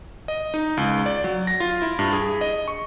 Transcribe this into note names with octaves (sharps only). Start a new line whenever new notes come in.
D#5
D#4
C#2
D5
F#3
A#6
F4
E4
G2
G#4
D#5
C#6